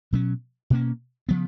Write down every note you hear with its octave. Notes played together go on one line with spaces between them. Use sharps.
B2 F#3 C#4
B2 A#3 C#4
C#3 F3 B3